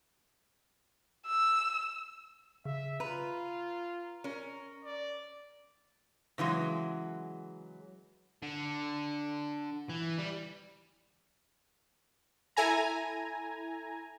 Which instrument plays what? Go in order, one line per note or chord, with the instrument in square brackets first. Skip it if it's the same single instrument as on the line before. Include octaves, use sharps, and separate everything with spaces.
[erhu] E6
[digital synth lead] C#3 [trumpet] E5
[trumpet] F4 [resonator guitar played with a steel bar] B4 [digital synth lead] A#5
[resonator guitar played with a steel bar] C#4 A#4
[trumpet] D5
[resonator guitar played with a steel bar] C#3 E3 F#3 G#3
[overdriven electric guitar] D3
E3
G3
[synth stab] E4 A4 G#5 A#5